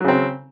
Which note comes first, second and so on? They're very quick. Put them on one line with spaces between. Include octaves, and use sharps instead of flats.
F#3 C#3 C4